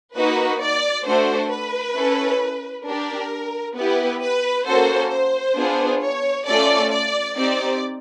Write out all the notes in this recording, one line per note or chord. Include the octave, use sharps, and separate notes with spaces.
A#3 D#4 F#4 B4
D5
A3 D4 F#4 A4 C5
B4
C#4 E4 A4
D4 G4 A#4
B3 E4 G4 B4
B4
A#3 C#4 F#4 A4 C5
C5
B3 D4 F4 G#4
C#5
A3 C#4 F4 A4 D5
D5
C4 D#4 G4 D5